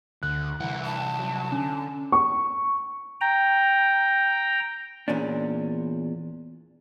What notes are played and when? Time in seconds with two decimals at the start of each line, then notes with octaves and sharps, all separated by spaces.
0.23 D2 D3 F#6
0.60 C2 E3 F#5
0.85 A5
1.19 F#3
1.52 D3 C#4
2.12 C#6
3.21 G5 A#5
5.08 E2 A#2 C#4 D4